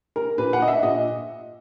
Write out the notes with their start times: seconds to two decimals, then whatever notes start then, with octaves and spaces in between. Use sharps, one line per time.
0.16 A#4
0.38 A#2 B4
0.53 F#5
0.62 D#5
0.68 E5
0.83 A#2 D#5